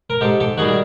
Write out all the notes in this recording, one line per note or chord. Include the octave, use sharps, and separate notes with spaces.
A#4
G#2 G4 A4
G4 A4
D#3 G3 F#4 G#4
G#4